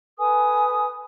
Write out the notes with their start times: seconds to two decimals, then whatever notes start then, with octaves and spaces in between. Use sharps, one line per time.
0.18 A4 B4 G#5 D#6